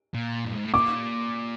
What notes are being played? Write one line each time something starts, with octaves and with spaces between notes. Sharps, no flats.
A#2
G2
G#2
A2
A#2 D6